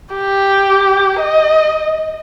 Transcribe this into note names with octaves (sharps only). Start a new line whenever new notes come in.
G4
D#5